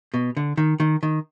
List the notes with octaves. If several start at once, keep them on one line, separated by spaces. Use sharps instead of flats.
B2
D3
D#3
D#3
D#3